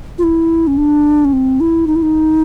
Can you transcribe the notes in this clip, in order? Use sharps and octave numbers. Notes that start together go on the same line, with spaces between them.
F4
E4
C#4
D4
C#4
C4
E4
D#4
E4
D#4